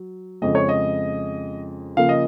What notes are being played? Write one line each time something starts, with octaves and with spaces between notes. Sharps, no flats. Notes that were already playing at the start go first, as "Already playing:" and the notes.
Already playing: F#3
F2 C#3 G#3 D#5
C#5
D#5
C#3 F3 A#3 F5
D#5